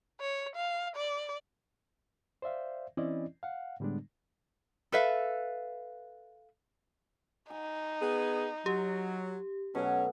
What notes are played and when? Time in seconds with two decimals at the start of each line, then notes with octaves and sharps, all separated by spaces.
0.20 C#5
0.56 F5
0.96 D5
2.42 C5 D5 E5 F5
2.97 E3 C4 C#4 E4 D5 D#5
3.43 F5 F#5
3.80 A2 D3 G3 G#3 B3 D4
4.92 A4 B4 E5 F5
7.50 D#4 G#5
8.00 B3 G#4
8.66 F#3 G4
9.75 B2 F#3 A3 C#4 F#4